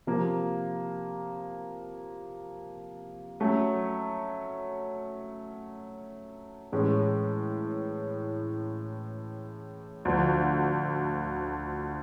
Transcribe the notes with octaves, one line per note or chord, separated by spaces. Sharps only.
C3 F3 A#3
F#3 A3 C#4
A2 E3 G#3 C#4
D2 D3 F3